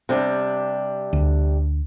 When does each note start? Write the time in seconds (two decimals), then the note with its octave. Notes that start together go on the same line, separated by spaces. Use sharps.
0.09 C3 G3 D4
1.13 D2